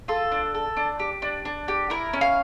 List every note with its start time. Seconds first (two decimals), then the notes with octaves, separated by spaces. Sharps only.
0.08 F4 A4
0.32 D4
0.55 A4
0.77 D4
0.99 G4
1.22 D4
1.45 D4
1.68 G4
1.90 E4 A#4
2.13 C#4
2.21 F5